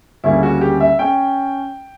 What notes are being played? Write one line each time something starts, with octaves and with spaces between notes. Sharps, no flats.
D2 C#3 G3 A#3 C#4 E4
F#4
G4
E5
C#4 G5